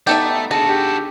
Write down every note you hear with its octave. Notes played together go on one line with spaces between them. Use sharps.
A3 B3 D#4 G4 A4 D5 E5
D4 F#4 G#4 A4 A5
G4